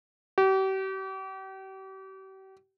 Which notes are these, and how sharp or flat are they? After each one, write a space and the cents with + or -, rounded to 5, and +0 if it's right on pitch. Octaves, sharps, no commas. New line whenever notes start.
G4 -40